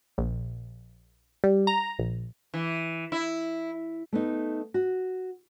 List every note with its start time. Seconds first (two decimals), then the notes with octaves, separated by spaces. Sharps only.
0.18 A#1
1.44 G3
1.67 A#5
1.99 A#1
2.54 E3
3.12 E4
4.13 A3 B3 D#4
4.74 F#4